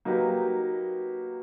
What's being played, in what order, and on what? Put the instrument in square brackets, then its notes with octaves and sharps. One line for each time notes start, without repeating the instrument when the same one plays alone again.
[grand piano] F#3 A#3 D#4 G4 B4